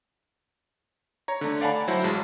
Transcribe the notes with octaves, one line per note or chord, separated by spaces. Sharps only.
C#5 A#5
D3 A3
D5 F5 F#5 G#5 A5 B5
A5
F#3 E4 C5 F#5
A1 G#3 A5